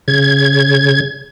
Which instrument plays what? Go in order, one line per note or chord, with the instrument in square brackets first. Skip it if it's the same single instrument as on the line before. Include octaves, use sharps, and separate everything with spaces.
[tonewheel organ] C#3 G#6